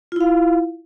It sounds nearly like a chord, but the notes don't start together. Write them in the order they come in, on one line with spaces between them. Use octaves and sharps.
F4 E4 F5